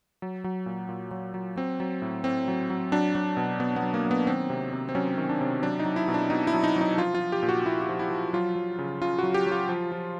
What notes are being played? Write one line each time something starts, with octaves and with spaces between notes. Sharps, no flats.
F#3
F#3
A#2
A#2
F#3
F#3
F#3 C4
F#3
A2
A2 C4
F#3
F#3
F#3 D4
F#3
B2
B2 B3
B3
F#3
A#3
F#3
B3
D#3 C4
C3
C3
C4
F#3 C#4
D#3
D4
C3
F#3 D4
D#4
F#3
E4
B2
D4
B2 D#4
E4
F#3
D#4
F#3
D#4
F3 F4
F4
F3
G4
A#2
F#4
A#2 E4
E4
F3
E4
F3
F#3 F4
F#3
C#3
C#3 F4
F#3 F#4
G4
F#3 F4
F3
F3